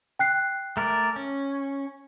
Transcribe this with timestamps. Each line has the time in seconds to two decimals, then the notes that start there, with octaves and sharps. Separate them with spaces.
0.19 G5 F#6 C7
0.77 A3 A#4 D5
1.16 C#4